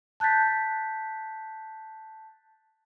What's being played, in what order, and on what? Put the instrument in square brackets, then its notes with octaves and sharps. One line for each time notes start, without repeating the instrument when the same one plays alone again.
[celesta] A5 F#6 G6 A6 B6